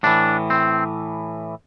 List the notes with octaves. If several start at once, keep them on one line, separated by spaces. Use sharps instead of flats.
A2 E3 D4
C4